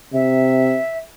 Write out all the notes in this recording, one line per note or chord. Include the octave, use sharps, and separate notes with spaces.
C3 E5